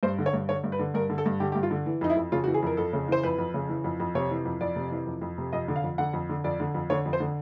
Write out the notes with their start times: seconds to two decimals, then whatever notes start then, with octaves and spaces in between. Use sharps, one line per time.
0.03 G2 C5
0.18 D3
0.26 C#5
0.33 G2
0.49 D3 C#5
0.64 G2
0.72 B4
0.79 D3
0.94 G2 A#4
1.10 D3
1.18 A4
1.26 G2
1.40 D3 G4
1.52 G4
1.55 G2
1.63 F4
1.71 D3
1.86 E3
2.01 F2 D#4
2.10 E4
2.17 F2
2.32 C#3 F4
2.44 F#4
2.47 E3
2.54 G#4
2.63 F2 A#4
2.77 F2 A4
2.93 C#3
3.08 E3 C5
3.24 F2 B4
3.39 F2
3.54 C#3
3.69 E3
3.84 F2
4.00 F2
4.15 C3 C#5
4.31 E3
4.45 F2
4.61 F2 D5
4.76 C3
4.91 E3
5.06 F2
5.22 F2
5.38 C3
5.53 F2 D#5
5.68 D3
5.76 F5
5.84 F2
5.98 D3 F#5
6.13 F2
6.29 D3
6.44 F2 D5
6.60 D3
6.75 F2
6.90 D3 C#5
7.06 F2
7.13 C5
7.20 D3